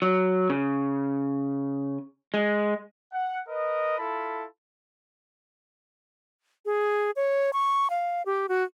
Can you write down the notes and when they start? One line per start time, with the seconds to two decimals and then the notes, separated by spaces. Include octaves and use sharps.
0.02 F#3
0.50 C#3
2.34 G#3
3.13 F#5
3.48 A#4 B4 D#5
3.98 E4 F4 A4 A5 B5
6.66 G#4
7.16 C#5
7.53 C#6
7.90 F5
8.26 G4
8.49 F#4